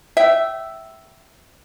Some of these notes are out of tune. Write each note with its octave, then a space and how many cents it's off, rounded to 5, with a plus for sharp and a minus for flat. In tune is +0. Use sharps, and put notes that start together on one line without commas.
E5 +0 G5 -30